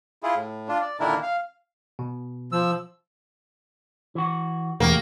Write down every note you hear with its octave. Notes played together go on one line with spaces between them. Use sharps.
E4 F4 G#4
A2
D4 F4
D5
A#2 D3 D#3 D4 E4 A#4
F5
B2
F3 E6
E3 F#4
E1 A3 A#3 F#4 G4